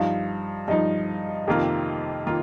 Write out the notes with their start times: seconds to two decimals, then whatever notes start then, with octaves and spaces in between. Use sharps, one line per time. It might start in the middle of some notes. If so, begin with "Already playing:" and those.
Already playing: G2 F3 D#4 F5
0.68 G2 F3 D#4 D#5
1.47 F2 C3 D#3 A#3 F4
2.26 D#3 A#3 F4